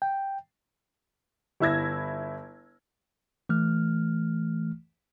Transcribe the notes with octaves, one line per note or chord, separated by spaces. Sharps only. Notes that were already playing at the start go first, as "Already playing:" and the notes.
G5
G1 E4 E6 G#6 A#6
E3 A3 F6